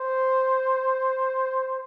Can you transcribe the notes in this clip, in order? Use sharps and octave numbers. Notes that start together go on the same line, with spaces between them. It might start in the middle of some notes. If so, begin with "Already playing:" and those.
Already playing: C5